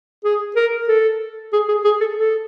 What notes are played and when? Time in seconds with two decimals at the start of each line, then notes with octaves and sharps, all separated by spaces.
0.25 G#4
0.56 A#4
0.89 A4
1.53 G#4
1.68 G#4
1.84 G#4
2.00 A4
2.16 A4